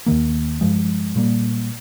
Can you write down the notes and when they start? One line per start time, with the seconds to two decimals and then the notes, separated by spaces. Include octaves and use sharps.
0.06 D#2 D#3 A#3
0.61 G2 F3 G#3
1.16 A#2 G3 A#3